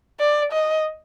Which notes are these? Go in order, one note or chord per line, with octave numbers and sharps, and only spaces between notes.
D5
D#5